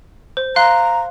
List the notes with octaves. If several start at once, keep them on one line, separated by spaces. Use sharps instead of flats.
C5
F5 A#5 C6 F#6